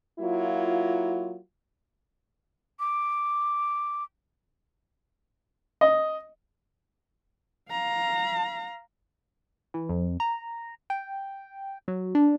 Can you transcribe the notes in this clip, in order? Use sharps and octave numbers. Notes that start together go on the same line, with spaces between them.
F#3 A#3 E4 F4
D6
D#5
F5 A#5
E3
F2
A#5
G5
F#3
D4